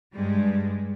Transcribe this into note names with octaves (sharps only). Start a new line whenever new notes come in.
G2 G3 G#3